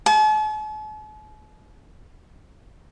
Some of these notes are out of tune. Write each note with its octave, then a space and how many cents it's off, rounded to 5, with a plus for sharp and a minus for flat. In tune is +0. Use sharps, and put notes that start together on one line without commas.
A5 -45